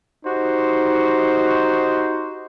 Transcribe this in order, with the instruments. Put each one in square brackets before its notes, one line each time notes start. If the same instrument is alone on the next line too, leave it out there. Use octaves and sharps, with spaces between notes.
[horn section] D#4 F#4 G4 C5